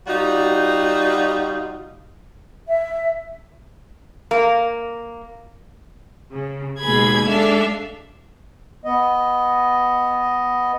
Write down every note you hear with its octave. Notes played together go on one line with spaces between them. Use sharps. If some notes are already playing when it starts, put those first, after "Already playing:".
G3 D#4 F4 F#4
E5
A#3
C#3
D#2 B2 G#3 G#4 B5 G#6
G#3 D4 A4 E5 F5
B3 D#5